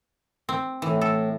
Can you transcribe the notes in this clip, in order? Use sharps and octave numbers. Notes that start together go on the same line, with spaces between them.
C4
A2 E3
A4